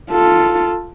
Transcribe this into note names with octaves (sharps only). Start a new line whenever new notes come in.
F4 A4